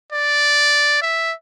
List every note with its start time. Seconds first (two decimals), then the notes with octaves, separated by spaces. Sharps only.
0.12 D5
1.02 E5